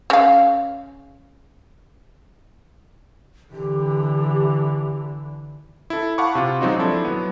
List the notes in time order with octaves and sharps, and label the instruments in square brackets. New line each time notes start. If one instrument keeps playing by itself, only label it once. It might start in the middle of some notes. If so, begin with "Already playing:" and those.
[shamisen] C#3 F5
[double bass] D3 E3 [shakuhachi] G4
[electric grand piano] E4 A4
F5 F#5 A5 B5 C#6 D6
C3 F4
F#3 G#3 C4 D#4 F4 F#4
F3 D4 E4 A4
F#3 B3